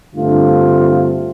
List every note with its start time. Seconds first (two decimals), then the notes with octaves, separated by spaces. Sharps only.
0.14 G2 D3 A3 C4 F4